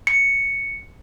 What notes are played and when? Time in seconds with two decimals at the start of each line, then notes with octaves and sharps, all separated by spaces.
0.07 C#7